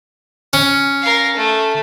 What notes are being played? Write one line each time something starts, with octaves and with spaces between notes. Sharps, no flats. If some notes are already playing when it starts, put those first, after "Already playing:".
C#4
A#4 F5
A3